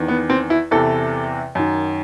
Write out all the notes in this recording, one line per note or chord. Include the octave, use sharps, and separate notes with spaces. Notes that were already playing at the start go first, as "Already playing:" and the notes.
Already playing: E2 D#3
B3
C4
E4
E2 C3 E3 A4
F#2 D#3